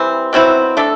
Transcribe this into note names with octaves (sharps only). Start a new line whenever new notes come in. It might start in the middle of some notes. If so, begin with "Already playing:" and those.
Already playing: E3 G3 C4
B2 F#3 C4 E4
A3 D4 A4